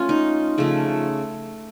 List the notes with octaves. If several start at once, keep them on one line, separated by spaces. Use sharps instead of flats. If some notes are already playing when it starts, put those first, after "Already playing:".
Already playing: A3 C#4 F4
D#4
C#3 F3 A3